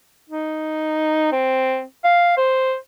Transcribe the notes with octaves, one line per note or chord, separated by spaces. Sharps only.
D#4
C4
F5
C5